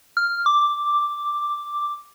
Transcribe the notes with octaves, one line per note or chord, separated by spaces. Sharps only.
F6
D6